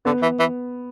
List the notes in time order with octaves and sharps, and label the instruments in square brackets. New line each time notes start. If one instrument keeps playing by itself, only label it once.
[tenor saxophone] D3 [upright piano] B3
[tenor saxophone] E3
E3